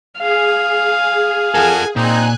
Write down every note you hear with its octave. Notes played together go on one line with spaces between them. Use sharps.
G#4 F5
F4 A4 A#4 F#5 G#5
A#2 C4 D#4 G#5 F#6